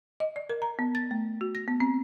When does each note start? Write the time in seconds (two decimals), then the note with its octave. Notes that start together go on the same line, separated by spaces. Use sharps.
0.20 D#5
0.36 D5
0.49 A#4
0.62 A#5
0.79 B3
0.95 A6
1.11 A3
1.41 F#4
1.55 A#6
1.68 B3
1.80 C4